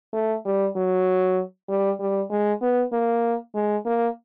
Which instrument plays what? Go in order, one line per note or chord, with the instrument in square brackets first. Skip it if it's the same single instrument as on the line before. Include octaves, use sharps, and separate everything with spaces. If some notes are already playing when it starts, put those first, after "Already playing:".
[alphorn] A3
G3
F#3
G3
G3
G#3
B3
A#3
G#3
A#3